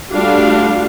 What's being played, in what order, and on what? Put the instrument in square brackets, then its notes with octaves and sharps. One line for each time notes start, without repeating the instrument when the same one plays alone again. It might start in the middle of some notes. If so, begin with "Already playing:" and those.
[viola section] G3 A3 D4 F4 F#4 F5